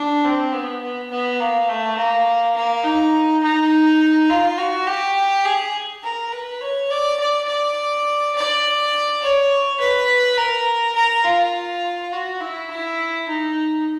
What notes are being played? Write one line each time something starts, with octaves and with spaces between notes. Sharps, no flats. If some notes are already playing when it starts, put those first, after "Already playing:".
Already playing: D4
C4
B3
B3
B3
A#3
A3
A#3
A#3
D#4
D#4
F4
F#4
G4
G#4
A#4
B4
C#5
D5
D5
D5
D5
C#5
B4
A#4
A#4
F4
F#4
E4
E4
D#4